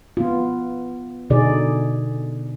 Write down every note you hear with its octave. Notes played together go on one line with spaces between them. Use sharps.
B3 F4
B2 D3 D#4 G#4 D5